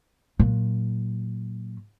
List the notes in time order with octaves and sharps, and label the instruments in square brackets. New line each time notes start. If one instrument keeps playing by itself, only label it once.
[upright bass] A#2 F#3